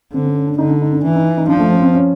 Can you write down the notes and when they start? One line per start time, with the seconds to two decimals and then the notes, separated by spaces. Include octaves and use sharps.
0.13 D3 C4
0.24 C#4
0.35 C#4
0.47 D4
0.58 D3 D#4
0.69 D4
0.81 D#4
0.92 D4
1.04 E3 D4
1.15 D#4
1.37 D#4
1.48 F3 D4
1.60 A3
1.71 C#4
1.82 C4
1.93 C#4